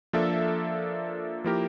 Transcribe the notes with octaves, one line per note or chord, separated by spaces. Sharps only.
F3 A#3 D4 A4 E5
F3 A#3 E4 G4 A#4